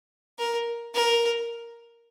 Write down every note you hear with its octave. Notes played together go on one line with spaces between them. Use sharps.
A#4
A#4